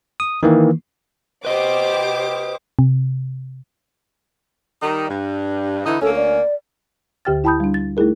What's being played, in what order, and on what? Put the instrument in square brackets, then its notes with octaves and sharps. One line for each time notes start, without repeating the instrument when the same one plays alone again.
[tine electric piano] D#6
D#3 E3 A#3
[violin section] G4 C5 D6 [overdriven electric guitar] B4 D#5
[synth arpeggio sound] C3
[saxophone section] D#3 G3 D#4
G2
[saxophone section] D3 E3 D#4 [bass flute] E4
[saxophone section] D2 A#3 C#4 [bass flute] A4
[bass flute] D5
[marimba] D2 D3 G4 G5 F6 A6
E4 G5 A5 B5 D#6 G6
G3 D4
A6
A3 D#4 E4 G#4 A#4